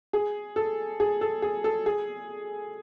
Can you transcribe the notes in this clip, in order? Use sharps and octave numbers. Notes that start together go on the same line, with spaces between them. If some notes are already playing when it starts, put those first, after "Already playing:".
G#4
A4
G#4
A4
G#4
A4
G#4